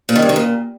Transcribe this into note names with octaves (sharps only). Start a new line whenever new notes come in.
A#2
D#3
G2
D#3
A#2